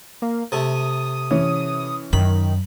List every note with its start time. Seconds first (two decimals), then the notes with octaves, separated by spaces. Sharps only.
0.22 A#3
0.52 C3 A3 D#6
1.31 E3 C#4
2.13 F#2 D#3 B5